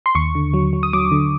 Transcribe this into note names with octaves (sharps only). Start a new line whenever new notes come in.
C6
D#2 C#6
D3
F#3
F#3
D#6
F#3 D6
D3